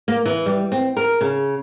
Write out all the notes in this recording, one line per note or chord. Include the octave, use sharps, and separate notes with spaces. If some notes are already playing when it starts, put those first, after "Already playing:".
A#3
E3
G3
C4
A#4
C#3